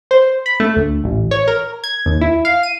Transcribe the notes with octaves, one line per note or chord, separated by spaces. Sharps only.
C5
B5
A3
D2
A1
C#5
A#4
G#6
D#2
E4
F5
D#7